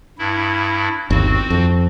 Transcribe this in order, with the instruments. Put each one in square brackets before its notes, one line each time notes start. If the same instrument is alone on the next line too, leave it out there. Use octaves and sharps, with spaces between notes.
[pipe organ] G2 E4
[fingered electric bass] G1 D#2 [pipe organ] C4 F#4
[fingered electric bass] F2